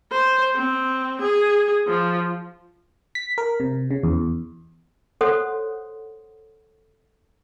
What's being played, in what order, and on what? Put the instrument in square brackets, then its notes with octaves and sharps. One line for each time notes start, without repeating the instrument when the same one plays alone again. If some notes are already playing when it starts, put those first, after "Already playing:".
[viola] C5
C4
G#4
F3
[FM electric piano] B6
A#4
C3
C#3
E2
[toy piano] A4 C5 C#5 F#5 C6 D#6